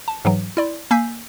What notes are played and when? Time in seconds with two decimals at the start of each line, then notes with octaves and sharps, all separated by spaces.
0.08 A5
0.25 G#2 E3 F#3
0.57 E4 D5 C6
0.91 A#3 G#5 E6 G6 B6 C7